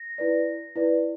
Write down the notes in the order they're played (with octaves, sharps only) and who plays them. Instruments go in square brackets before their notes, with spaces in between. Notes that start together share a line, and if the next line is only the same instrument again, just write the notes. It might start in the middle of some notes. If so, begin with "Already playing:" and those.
Already playing: [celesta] A#6
E4 B4 D5
E4 B4 D5